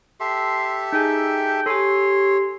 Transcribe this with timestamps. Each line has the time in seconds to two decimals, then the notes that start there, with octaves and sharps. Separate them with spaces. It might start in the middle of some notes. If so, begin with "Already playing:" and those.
0.20 G4 A4 E5 C6
0.93 D#4 G#4 G5 G#5
1.66 G4 A4 C#5 G#5 C6